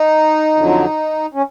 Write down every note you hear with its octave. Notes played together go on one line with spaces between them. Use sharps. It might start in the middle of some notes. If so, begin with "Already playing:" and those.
Already playing: D#4
F2 D3 F#3
C#4